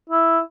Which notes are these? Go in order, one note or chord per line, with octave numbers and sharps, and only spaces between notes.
E4